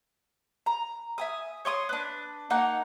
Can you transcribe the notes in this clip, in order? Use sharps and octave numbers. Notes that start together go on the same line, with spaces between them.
A#5
E5 G#5 D#6
C#5 C6 D6 D#6
D4 B4
A#3 D#4 F#5